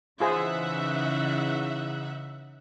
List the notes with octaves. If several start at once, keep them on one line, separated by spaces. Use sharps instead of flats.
C#3 E3 D#4 F4 G#4 C5 E5 F#5